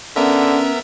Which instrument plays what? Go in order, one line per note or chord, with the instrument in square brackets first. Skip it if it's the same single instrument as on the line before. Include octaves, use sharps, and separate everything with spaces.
[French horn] D3 [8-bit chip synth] B3 A#4 E5 [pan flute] C#4